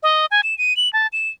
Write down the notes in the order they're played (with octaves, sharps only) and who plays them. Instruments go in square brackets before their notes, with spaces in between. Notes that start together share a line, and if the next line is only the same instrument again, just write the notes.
[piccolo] D#5
G#5
E7
D#7
F#7
A5
E7